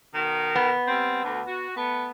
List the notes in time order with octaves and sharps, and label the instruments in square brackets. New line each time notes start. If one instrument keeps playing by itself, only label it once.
[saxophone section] B2 D#3
[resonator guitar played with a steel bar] B3
[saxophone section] G3 C4
D2
F#4
A3 B3